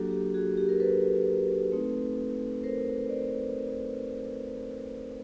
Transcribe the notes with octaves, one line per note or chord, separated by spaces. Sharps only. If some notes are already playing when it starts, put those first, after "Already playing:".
Already playing: F#3 A#3 D4 F#4 G4 A4
G4
F#4 G#4
G4
A#4
A4 B4
A3 C4 D#4
A#4 C5
C5 D5